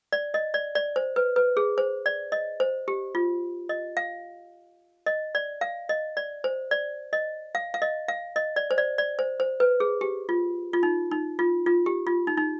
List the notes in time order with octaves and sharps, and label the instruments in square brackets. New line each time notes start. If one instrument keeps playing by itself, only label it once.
[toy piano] D5
D#5
D5
D5
C5
B4
B4
G#4
C5
D5
D#5
C5
G4
F4
D#5
F5
D#5
D5
F5
D#5
D5
C5
D5
D#5
F5
F5
D#5
F5
D#5
D5
C5
D5
D5
C5
C5
B4
G#4
G4
F4
F4
D#4
D#4
F4
F4
G4
F4
D#4
D#4